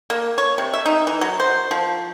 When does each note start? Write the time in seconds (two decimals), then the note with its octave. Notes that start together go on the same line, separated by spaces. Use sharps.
0.10 A#3
0.38 C#5
0.58 C3
0.74 E5
0.86 D#4
1.07 E3
1.21 F#3
1.40 C5
1.71 F3